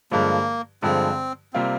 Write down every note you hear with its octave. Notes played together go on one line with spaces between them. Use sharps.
G2 D3 F3 G#3 A#3
G2 D3 F3 G#3 C4
C3 G3 A#3 C4 F4